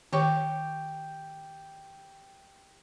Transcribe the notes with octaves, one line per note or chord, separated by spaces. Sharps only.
D#3 G4 C#5 C#6